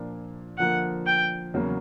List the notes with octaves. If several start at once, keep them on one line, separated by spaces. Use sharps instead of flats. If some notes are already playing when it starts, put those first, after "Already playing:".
Already playing: A#2 F3 A#3 D4 F4
D3 F3 A#3 F#5
G5
E2 C#3 F#3 A#3 C#4